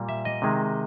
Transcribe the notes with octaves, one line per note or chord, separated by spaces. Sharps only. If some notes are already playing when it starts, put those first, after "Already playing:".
Already playing: A#2 G3 A#3
E5
D#5
C3 D#3 G#3